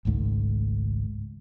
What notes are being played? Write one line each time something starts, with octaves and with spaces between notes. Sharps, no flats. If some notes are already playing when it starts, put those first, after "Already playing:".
G#1 C#2 G#2 A3